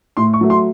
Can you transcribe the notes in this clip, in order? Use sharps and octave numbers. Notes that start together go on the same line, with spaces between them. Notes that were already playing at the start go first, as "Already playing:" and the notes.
A2 C6
C#6
F#3 A3
C6